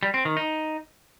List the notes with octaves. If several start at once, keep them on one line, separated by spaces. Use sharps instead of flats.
G3
C4
D#3
D#4